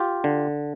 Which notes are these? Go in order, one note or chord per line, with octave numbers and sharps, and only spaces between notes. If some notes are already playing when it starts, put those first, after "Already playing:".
Already playing: F4 G4
D3